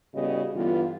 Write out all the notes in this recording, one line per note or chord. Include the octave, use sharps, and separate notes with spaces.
A2 C#3 G3 B3 F#4 D#5
G2 D3 E3 G3 B3 F4